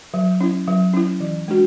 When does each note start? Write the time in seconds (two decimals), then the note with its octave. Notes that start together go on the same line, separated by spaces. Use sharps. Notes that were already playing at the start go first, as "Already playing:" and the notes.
0.14 F#3
0.41 C#4 E4
0.67 F#3
0.93 C#4 E4
1.20 E3
1.48 G#3 D4 F#4